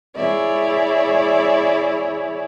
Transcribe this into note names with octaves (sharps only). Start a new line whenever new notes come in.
E4 G#4 C#5 D5 E5